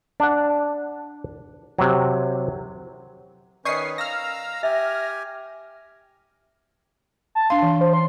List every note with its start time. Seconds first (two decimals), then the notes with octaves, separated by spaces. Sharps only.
0.20 D4 F#5
1.79 C3 F#3
3.65 D#3 C#4 B4 D5 D#5 C#6 D#6 C7
3.98 F5 A#5 E6 F6 A#6
4.63 G4 E5 G#5
7.35 A5
7.50 D4 F5 C6
7.62 E3
7.81 C5
7.93 C6